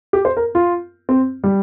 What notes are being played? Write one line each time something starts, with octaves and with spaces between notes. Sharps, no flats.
G4
C5
A#4
F4
C4
G3